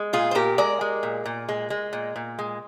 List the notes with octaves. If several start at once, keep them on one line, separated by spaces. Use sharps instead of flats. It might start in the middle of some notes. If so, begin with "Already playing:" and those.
Already playing: G#3
A#2 F4 G#4
C5
A#2 G4 A#4
G#3 A#4 D5
G#3
A#2
A#2
G#3
G#3
A#2
A#2
G#3